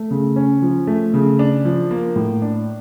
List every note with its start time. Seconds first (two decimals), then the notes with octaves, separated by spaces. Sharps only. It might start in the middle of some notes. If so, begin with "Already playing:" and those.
Already playing: A3
0.11 C#3
0.36 C#4
0.62 F3
0.87 A3
1.14 C#3
1.39 D4
1.65 F3
1.91 A#3
2.16 A2
2.42 D4